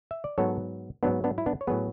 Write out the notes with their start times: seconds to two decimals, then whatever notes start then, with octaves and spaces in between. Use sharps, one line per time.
0.11 E5
0.24 D5
0.38 G#2 F#3 B3 A4 C#5
1.03 G#2 F#3 B3 D4
1.24 B3 D4
1.38 E4
1.46 B3 D4
1.61 C#5
1.67 A2 F#3 B3 G#4 B4